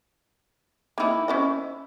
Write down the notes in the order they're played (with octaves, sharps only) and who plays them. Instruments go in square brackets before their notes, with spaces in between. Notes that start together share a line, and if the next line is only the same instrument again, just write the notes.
[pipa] D#3 E4 [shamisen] A#3 D#4
[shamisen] C#4 C5 D#5